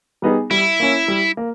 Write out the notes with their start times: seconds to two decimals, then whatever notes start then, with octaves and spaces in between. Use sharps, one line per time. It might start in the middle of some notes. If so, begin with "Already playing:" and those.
0.22 G3 B3 D#4 G#4
0.51 G3 E4
0.80 A#3 C#4
1.08 G3
1.37 A#3